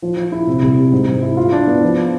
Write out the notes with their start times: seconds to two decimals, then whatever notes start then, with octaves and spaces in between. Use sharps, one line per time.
0.02 F3
0.17 F3
0.32 E4
0.47 C3
0.62 C2
0.77 C3
0.92 G#2
1.08 G#2
1.22 E4
1.37 F4
1.52 D4
1.67 B3
1.82 F3